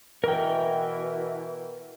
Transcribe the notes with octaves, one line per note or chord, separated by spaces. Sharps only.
B2 E3 A#4 G5